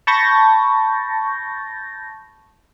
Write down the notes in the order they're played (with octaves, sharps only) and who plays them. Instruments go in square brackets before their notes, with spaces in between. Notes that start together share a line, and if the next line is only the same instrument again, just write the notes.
[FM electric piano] A5 B5 C#6 G6 A6 A#6